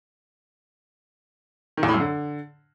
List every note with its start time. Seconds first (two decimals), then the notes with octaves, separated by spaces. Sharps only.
1.77 D#3
1.83 E2
1.89 A2
1.94 F#2
2.00 D3